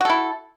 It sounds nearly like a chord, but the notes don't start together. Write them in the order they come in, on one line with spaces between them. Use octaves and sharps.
F#4 A4 E4